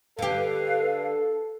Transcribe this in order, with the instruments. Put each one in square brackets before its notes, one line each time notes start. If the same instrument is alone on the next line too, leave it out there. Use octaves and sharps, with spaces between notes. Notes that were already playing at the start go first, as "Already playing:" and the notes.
[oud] D3 G4 [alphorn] A4 [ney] B4 [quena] F5